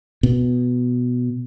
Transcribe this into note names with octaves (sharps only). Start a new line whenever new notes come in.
B2